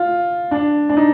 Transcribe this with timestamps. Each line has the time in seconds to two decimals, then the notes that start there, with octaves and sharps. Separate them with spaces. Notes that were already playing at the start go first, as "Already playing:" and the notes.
Already playing: F4
0.51 D4
0.89 D4
0.97 D#4